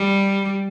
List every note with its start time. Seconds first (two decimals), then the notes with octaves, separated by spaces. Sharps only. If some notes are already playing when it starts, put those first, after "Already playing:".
Already playing: G3